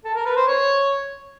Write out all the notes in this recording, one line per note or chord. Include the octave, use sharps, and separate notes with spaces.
A4
A#4
B4
C5
C#5